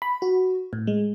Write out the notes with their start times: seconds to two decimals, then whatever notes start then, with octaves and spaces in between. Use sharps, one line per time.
0.02 B5
0.22 F#4
0.73 A2
0.87 G#3